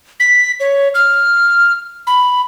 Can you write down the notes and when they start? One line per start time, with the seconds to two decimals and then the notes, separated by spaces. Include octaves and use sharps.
0.20 B6
0.60 C#5
0.95 F6
2.07 B5